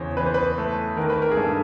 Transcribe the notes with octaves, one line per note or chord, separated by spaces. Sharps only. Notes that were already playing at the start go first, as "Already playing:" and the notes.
Already playing: E2 C#3 C5 C#5
E3 B4
C5
B4
A3
D#3 A#4
B4
A#4
G#4
G2 A4